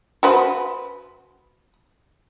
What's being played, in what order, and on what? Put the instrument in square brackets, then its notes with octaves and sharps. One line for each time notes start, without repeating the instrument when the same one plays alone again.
[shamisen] F#4 B4 C5